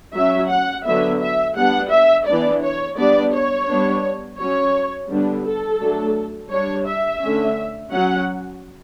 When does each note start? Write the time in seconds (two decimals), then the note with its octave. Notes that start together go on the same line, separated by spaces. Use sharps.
0.15 F#3 C#4 E5
0.50 F#5
0.85 D3 F#3 B3 E5
1.21 E5
1.56 G3 B3 D4 F#5
1.91 E5
2.26 E3 B3 D4 D5
2.62 C#5
2.97 G3 B3 D4 D5
3.33 C#5
3.68 G3 B3 D4
4.39 F#3 C#4 C#5
5.09 D3 G3 B3 D4
5.45 A4
5.80 F#3 A3 D4
6.51 G3 D4 C#5
6.86 E5
7.21 D3 A3 C#4
7.92 F#3 C#4 F#5